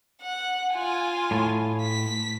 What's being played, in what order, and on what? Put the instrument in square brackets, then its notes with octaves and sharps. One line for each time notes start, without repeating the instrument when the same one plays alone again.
[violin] F#5
F4 G#5
[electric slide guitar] A2
[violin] B6